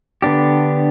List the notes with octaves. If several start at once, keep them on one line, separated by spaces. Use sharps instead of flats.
D3 B3 D4 G4